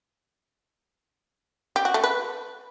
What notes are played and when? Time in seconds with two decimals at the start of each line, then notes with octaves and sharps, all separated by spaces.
1.76 G4
1.85 F#4
1.94 A3
2.04 B4